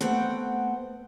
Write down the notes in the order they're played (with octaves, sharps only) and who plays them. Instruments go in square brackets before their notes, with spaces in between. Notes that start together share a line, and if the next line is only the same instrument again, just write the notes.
[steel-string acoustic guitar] A3 B3 C4 C5 F#5 G5